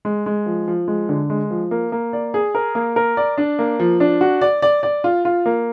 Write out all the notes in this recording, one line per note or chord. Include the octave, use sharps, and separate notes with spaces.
G#3
G#3
F3
F3
G#3
D3
G#3
F3
A#3
A#3
D5
G#4
A#4
A#3
A#4
D5
D4
A#3
F3
D4
F#4
D5
D5
D5
F4
F4
A#3